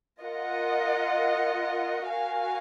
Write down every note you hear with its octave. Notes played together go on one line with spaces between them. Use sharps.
F4 A#4 D#5 F#5
F#4 A#4 F5 G#5